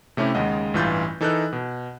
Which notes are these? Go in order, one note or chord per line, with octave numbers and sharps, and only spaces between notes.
C3 A3 C#4 E4 G4
D#2 C#3 G#3 D#5 F#5
A1 G2 E3 F4 G6 A6
E3 D#4 A4 A#4 D#5 F#6
B2